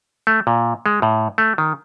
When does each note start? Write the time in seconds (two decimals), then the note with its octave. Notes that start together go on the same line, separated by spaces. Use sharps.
0.27 A3
0.47 A#2
0.86 G#3
1.02 A2
1.38 A3
1.58 D#3